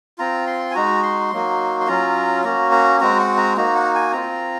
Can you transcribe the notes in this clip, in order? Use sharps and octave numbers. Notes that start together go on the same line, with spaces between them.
C4 F4 A#5
C6
G#5
G#3 D#4 F#4 A#5
C6
F#3 A#3 D#4 F#4
C6
F#3 C#4 F4 A#5
A#3 C#4 F#4 A#5
A#5
G#3 C4 F#4 A#5
F#5
A#5
A#3 D#4 F#4 A#5
F#5
G#5
C4 F4 A#5